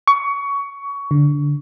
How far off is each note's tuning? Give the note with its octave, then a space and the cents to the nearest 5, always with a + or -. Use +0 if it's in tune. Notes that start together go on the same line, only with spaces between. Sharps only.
C#6 +20
D3 -15